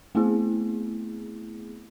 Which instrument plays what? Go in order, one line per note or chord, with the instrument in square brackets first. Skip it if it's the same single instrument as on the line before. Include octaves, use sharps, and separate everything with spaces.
[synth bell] A3 B3 C4 E4 G#4